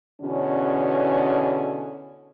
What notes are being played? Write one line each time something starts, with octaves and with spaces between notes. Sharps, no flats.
E2 B2 D3 C#4